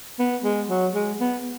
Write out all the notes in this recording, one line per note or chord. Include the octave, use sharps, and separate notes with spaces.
B3
G#3
F#3
G#3
B3